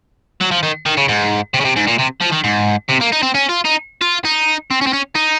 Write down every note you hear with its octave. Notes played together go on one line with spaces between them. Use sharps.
F#3
F3
D#3
D#3
C#3
G#2
C3
C#3
C3
G#2
A#2
C3
F3
D#3
G#2
C3
A#3
D#4
C4
C#4
F4
D#4
F4
D#4
C4
C#4
C4
C#4
D#4